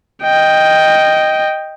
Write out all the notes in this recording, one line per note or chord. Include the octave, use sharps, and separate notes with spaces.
D#5 G5